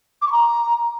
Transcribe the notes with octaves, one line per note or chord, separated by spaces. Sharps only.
D6
C#6
A#5